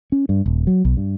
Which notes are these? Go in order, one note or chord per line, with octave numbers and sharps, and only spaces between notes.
C#4
G2
D#1
F#3
B1
G2